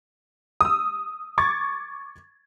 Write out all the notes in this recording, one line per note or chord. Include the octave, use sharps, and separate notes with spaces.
D#6 E6
C#6 D6 G#6 A6